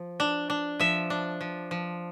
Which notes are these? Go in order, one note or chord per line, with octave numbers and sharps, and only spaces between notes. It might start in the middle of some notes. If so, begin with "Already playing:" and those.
Already playing: F3
D4
D4
F3 E5
D4
F3
F3